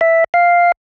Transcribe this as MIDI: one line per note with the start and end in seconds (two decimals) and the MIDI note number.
0.01 0.24 76
0.34 0.72 77